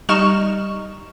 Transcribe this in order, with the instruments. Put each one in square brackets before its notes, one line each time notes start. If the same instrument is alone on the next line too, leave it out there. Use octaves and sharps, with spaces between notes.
[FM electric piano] G3 [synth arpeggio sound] D#4 F6 E7 [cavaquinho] C#6